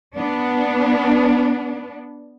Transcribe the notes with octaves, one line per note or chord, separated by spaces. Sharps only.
B3 D4